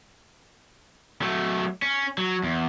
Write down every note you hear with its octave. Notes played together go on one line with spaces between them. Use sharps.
F#3 A3
C#4
F#3
E2